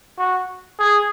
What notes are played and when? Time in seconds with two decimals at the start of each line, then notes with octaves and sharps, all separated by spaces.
0.18 F#4
0.79 G#4